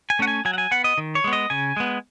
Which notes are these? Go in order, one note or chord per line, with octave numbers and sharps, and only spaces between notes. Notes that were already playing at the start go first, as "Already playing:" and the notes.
G#5
A3 C#4 F#5
G#5
F#3 G#5
F#5
G#5
B3 F#5
D#5
D#3
C#5
G#3 B3
D#5
C#3 G#5
G#3 B3